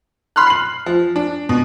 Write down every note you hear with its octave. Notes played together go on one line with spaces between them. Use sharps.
B5 C6 F6 F#6
C7 F#7
F3
D4
B2